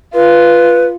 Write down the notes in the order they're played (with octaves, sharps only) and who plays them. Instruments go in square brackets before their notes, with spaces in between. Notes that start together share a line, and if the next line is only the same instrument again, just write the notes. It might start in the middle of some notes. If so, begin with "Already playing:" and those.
[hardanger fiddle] F4 [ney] B4